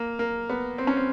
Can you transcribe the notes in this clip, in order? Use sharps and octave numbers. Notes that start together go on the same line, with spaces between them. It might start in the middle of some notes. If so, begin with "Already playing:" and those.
Already playing: A#3
A#3
B3
C4
C#4
C4